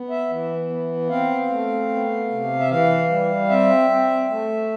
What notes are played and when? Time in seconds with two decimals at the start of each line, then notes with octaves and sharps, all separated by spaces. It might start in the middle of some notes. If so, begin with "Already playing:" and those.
Already playing: B3
0.10 E5
0.30 E3
0.70 B3
1.10 C4 F5
1.50 A3
1.90 B3
2.30 C3
2.60 E5
2.70 E3 F5
3.10 G3
3.49 C4 E5
3.90 C4
4.30 A3